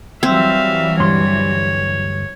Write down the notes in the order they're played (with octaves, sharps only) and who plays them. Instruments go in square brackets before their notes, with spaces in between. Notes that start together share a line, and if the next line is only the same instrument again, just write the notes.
[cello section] E3 F#3 G3 [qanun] C4 [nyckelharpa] E5 F5
[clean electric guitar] D2 G2 C6 [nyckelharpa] C#5